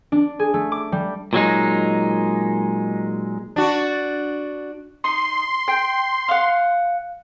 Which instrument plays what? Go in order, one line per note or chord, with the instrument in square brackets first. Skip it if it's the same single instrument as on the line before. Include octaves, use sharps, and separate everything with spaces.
[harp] D4
G#4
A3
D6
G3
[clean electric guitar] A#2 F#3 G#3 D#4
[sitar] D4 F#4
[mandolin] D#4 [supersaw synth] C6
[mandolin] G5
F5 F#5